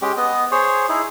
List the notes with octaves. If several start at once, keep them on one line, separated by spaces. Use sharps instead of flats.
G#3 C#4 G4
B3 D#5
G#4 C5 C#5
D#4 E4 G#4